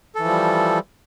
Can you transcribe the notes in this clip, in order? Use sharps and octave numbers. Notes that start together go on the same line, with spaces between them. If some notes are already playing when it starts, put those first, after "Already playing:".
E3 F3 G3 A4